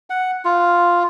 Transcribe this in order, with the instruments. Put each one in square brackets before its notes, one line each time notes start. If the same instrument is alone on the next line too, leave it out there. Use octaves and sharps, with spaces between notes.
[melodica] F#5
F4